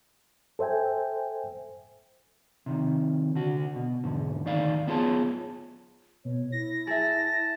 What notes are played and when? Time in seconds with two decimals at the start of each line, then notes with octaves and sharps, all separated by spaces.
0.59 A4 C5 E5 G5 G#5
2.66 C3 D#3
3.35 D3 F#4
3.76 B2
4.04 E2 G#2 D3
4.45 D2 D#3 D#4 D5 F5
4.87 B3 E4 F4 G#4 C#5 A5
6.25 B2 C#5
6.52 E4 A#6
6.87 G#4 E5 A5